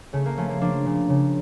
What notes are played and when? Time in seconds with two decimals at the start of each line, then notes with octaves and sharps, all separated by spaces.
0.13 C#3 A3
0.26 A#3
0.37 F3 A3 C#4
0.49 A#3
0.61 F3 A#3 D4
0.86 C#3
1.09 C#3